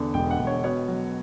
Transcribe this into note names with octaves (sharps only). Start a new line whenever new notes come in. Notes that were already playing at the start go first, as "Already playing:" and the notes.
Already playing: E2 D3
E1 G5
F#5
E1
C#5
B2 C#5
F#3